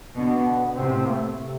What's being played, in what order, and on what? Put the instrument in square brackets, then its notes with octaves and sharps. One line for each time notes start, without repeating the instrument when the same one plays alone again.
[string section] B2 D3 [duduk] B3
[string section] A2 C3 [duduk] C4
[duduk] C4
A3
C3